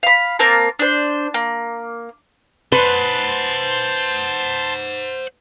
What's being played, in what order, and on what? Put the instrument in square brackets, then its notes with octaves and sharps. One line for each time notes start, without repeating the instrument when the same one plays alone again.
[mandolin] F5 B5
A#3 C4 A#4 A5
D4 C5
A#3
[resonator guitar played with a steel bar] B4 [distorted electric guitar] C5 F#5 [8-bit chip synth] A5 C6